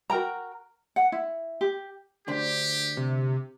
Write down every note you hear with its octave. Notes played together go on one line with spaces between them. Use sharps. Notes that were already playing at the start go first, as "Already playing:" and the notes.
F#4 A#4 G5 A#5
F#5
E4
G4
D2 D4 G4 C5
C3